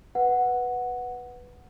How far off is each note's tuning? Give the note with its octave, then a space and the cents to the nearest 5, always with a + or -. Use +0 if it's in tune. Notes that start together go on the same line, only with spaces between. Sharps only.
B4 +0 F#5 -5